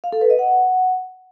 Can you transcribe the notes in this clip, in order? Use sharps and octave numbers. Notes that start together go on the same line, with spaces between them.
F5
A4
B4
D#5
F#5